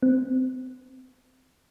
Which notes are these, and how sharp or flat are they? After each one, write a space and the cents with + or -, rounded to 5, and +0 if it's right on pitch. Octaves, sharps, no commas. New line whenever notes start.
C4 -25